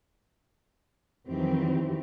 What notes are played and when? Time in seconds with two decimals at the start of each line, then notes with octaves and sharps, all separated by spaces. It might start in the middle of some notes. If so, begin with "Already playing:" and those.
1.28 F2 D#3 E3 F#3 C4 G4